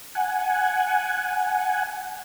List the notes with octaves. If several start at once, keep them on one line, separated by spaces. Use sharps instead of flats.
F#5 G#5